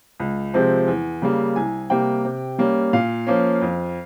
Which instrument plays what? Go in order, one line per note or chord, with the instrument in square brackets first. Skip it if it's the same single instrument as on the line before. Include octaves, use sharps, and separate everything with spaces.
[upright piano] C#2
C3 F3 G#3 C4
E2
C#3 G3 A#3
C2 G#5
C3 G3 A#3 G5
C3
G3 A#3 C#4
A#2 F5
F3 A#3 C#4
F2